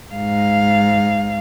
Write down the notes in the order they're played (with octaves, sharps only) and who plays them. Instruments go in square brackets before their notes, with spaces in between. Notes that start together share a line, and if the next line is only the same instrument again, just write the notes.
[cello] G#2 F5